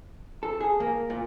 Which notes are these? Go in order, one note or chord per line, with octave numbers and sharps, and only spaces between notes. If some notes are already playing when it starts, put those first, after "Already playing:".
A4
G#4
A#3
A#2